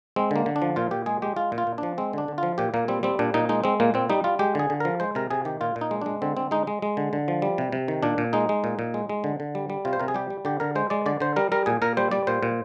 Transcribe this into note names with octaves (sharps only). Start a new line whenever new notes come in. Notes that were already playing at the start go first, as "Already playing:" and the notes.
G#3 C4
D3 A#3
D3
D4
F3
A#2 F4
A#2 G4
G#3 G#4
G#3 G4
G#3 F4
A#2
F4
A#2
D4
F3
G#3 C4
D3 D4
D3
F3 F4
A#2 G4
A#2 A#3
G3 C4
G3 C4
A#2 D4
A#2 D#4
G#3 D#4
G#3 C4
A#2 A#3
A#2 C4
G3 D#4
G3 F4
G#3 G4
D3 G#4
D3
F3 A#4
G#3 C5
C3 A#4
C3 G#4
D#3 G4
A#2 F4
A#2
D#4
G#3
G#3 D4
D3 C4
D3 C4
G#3 D#4
G#3
G#3
D3
D3
F3
G3
C3
C3
D#3
A#2 D4
A#2
G#3 D#4
G#3
A#2
A#2
G#3
G#3
D3
D3
G3
G3
C3 F4
C5
C3 A#4
G#4
G3 G4
G3
D3 G4
D3 A#4
G#3 C5
G#3 D5
D3 D5
D3 C5
G3 A#4
G3 A#4
A#2 G#4
A#2 A#4
G3 C5
G3 D5
A#2 C5
A#2